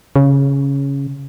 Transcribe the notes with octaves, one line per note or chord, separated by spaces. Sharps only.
C#3